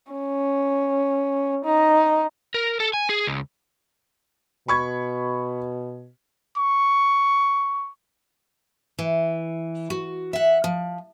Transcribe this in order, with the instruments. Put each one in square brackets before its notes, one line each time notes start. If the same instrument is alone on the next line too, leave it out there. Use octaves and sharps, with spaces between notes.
[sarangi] C#4
D#4
[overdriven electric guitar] A#4
A4
G#5
G#4
C#2
[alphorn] B2 [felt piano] B5 C#6 G#6
[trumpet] C#6
[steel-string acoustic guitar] E3
F#4
E5 F#5
F3